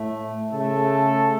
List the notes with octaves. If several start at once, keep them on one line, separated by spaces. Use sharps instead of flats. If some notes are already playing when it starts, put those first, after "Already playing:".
Already playing: A2 A3
C#3 A3 A4